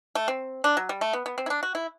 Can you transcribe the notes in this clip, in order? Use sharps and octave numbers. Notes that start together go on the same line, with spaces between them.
A3
C4
D4
F#3
G3
A3
B3
B3
C4
E4
D4
F#4
E4